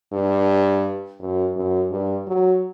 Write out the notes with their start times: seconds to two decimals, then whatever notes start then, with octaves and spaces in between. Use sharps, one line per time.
0.13 G2
1.20 F#2
1.56 F#2
1.91 G2
2.27 F#3